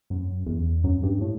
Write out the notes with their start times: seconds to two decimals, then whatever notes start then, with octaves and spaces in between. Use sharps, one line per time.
0.10 F#2
0.47 E2
0.84 F#2
1.03 G2
1.21 A2